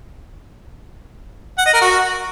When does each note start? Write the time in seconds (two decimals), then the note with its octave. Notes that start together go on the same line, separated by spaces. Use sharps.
1.58 F#5
1.66 D#5
1.74 A#4
1.81 F#4